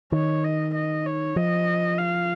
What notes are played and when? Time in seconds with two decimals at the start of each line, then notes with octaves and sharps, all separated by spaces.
0.12 D#3 C#5
0.44 D#5
0.75 D#5
1.06 C#5
1.36 F3 D#5
1.98 F5